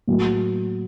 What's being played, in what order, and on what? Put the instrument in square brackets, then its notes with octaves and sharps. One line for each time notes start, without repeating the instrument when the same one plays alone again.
[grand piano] A2 F#3 A#3